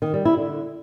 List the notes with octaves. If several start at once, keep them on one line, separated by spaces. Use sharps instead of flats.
D#3
G3
E4
D3